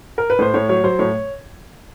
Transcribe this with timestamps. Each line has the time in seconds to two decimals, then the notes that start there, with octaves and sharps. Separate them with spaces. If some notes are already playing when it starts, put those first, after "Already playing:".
0.18 A#4
0.30 B4
0.39 A2 C5
0.54 A2 C#5
0.69 F#3 C#5
0.84 F#3 C5
0.99 A2 C#5